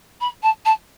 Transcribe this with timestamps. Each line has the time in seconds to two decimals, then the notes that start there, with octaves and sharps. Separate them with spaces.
0.20 B5
0.43 A5
0.65 A5